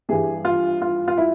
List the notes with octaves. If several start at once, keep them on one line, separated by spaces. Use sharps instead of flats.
G2 E3 G3 G#4
F4
F4
F4
E4